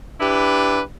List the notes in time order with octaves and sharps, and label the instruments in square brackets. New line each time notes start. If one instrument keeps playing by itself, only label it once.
[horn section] D4 E4 G4 B4